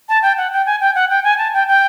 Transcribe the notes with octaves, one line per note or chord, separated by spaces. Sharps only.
A5
G5
F#5
G5
G#5
G5
F#5
G5
G#5
A5
G5
G5